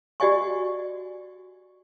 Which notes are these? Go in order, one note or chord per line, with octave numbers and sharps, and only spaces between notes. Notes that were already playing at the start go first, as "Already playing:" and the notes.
F#4 G4 D5 D#5 G#5 C#6